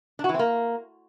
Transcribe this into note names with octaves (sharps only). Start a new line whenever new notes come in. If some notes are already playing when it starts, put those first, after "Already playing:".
D4
F#4
E3
C4
A#3